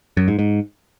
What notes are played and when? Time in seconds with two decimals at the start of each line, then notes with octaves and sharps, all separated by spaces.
0.17 F#2
0.28 G#2
0.39 G#2